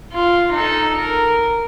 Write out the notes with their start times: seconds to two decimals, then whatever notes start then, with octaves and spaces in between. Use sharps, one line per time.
0.13 F4
0.53 D#4 A4
0.98 A#4